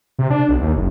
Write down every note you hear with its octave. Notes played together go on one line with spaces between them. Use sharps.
C3
D4
B1
D#2
F#1